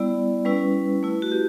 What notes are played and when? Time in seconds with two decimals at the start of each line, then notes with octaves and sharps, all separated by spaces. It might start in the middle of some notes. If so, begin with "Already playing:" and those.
Already playing: G3 B3 E4 D5
0.45 G3 C#4 E4 B4
1.03 A3 E4
1.22 F#4
1.32 G4